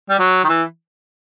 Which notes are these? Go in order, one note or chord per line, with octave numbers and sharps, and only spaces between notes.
G3
F#3
D#3
E3